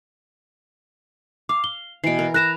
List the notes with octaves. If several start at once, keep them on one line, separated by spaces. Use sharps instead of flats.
F5 D6
G7
B2 E3 C7 D7
A#4
A#4 B4 A#5 F#6 A#6 E7